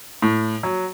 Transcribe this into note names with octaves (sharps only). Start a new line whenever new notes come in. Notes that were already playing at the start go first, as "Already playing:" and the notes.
A2
F#3